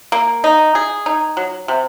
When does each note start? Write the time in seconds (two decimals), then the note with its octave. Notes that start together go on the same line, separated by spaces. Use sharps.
0.12 A#3
0.44 D#4
0.75 G#4
1.06 D#4
1.37 F#3
1.68 C3